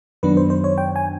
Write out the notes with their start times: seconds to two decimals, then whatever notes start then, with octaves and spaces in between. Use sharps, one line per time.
0.23 F#2 D#3 F#3 B3 D4 B4
0.37 C5
0.50 C5
0.64 C#5
0.78 G5
0.96 G#5